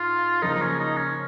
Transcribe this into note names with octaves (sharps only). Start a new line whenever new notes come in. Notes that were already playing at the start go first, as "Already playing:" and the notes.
Already playing: G#2 F4
C#3 F3 A#3 D#4
D#4
C#4
D#4
C#4